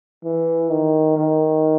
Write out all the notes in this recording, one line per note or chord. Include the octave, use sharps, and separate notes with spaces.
E3
D#3
D#3